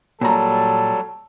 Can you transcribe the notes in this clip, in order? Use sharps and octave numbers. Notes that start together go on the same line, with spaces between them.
A#2 F#3 G3 A4 A#5